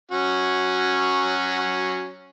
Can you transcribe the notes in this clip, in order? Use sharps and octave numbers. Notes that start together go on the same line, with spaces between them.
F#3 C#4 F#4